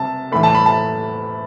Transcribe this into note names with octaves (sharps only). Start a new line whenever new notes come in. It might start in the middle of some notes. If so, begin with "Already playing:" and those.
Already playing: C3 A5
A2 E3 A3 B5
A5
B5
A5